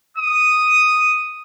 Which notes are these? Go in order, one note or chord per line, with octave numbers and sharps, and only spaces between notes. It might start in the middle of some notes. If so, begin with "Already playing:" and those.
D#6